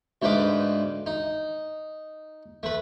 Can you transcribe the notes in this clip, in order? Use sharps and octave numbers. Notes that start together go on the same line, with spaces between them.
D2 G#2 D#4 B4 F5 D6
D#4
A3 B4